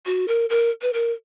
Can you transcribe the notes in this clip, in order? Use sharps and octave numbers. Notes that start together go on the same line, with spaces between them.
F#4
A#4
A#4
B4
A#4